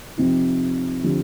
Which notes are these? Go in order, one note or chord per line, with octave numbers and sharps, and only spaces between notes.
C3 F3 C4 D#4
D3 F3 C4 G4